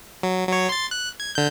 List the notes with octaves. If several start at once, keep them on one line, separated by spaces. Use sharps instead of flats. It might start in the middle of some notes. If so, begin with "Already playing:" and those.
F#3
F#3 C#5
C6 A6
F#6
G#6
D3 G6